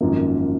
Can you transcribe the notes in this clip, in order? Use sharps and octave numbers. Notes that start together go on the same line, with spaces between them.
G#1 F#2 F3 A#3